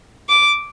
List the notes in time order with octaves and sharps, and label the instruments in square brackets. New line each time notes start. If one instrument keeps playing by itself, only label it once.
[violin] D6